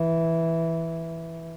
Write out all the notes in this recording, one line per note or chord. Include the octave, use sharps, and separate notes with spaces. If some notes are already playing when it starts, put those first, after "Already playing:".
Already playing: E3